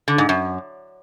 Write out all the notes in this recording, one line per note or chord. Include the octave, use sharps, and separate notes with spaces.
D3
G#2
F#2